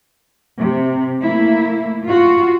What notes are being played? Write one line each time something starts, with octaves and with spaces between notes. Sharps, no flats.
C3
A3 A#3 E4
F4 F#4